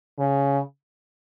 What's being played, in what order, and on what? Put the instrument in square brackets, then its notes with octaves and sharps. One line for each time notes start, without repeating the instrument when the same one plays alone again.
[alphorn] C#3